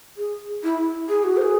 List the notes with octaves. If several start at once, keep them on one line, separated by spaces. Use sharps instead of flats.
G#4
E4
G#4
F#4
C5
G#4